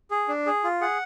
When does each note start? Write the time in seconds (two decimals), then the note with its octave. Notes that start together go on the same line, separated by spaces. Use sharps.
0.11 G#4
0.28 D4
0.46 G#4
0.64 F4
0.81 G#4 F#5